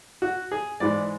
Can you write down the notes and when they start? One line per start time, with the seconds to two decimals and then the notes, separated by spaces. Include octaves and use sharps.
0.22 F#4
0.52 G#4
0.80 G#2 E3 G#3 D5